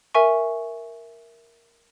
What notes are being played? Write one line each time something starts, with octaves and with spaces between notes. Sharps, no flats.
A#4 E5 G#5 C#6